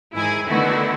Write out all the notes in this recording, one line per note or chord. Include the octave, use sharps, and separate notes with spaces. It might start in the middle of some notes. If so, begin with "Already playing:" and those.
G#2 D#3 E4 G#4 G#5
D3 D#3 A3 B3 E4 F#4